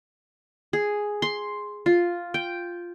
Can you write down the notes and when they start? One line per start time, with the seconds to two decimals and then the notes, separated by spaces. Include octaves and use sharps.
0.73 G#4
1.22 C6
1.86 F4
2.34 G5